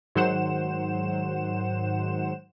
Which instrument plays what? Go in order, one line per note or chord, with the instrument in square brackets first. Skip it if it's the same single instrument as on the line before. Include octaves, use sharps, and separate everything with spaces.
[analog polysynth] G#2 D#3 F#3 C5 F#5 E7